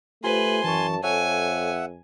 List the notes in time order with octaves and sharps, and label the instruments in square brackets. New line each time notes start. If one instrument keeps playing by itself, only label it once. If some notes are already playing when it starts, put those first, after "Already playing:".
[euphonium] A3 [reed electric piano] F4 G4 C5 [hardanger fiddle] B4 [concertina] G#5 C6
[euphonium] F#2 [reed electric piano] E3 C#6 [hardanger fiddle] A5
[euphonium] F2 [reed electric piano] A4 C#5 [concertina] E5 F#5 [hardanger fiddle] G#5